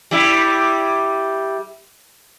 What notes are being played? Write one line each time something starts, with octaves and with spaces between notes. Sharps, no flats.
G3 E4